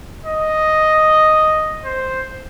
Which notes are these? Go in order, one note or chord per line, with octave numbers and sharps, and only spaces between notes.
D#5
C5